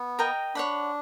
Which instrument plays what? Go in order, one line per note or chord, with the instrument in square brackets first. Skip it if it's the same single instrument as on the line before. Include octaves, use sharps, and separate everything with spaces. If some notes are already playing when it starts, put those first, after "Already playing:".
Already playing: [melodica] B3
[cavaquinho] A#4 D#5 G5 A#5
[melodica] D4 [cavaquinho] C#5 F#5 B5